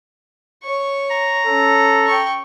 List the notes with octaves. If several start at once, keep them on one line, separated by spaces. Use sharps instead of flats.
C#5 C#6
A#5
C#4 A4
G5 C#6